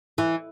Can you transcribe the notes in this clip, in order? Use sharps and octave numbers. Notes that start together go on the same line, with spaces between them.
E3